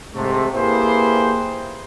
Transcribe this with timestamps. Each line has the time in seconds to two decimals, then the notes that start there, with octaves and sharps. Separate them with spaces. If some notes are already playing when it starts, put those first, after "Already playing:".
0.15 G#2 C3 A3
0.54 A#3 E4 G4 G#4 B4 C5